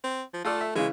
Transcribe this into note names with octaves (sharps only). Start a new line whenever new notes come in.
C4
F3
A3 F4 A4 D5
E5
C#3 E3 G#3